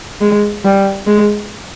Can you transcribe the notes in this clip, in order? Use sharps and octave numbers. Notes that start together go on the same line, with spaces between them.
G#3
G3
G#3